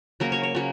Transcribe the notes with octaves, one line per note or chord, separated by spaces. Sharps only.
C#3 F#3 A#3 A#4
C#5
C#5
C#3 F#3 A#3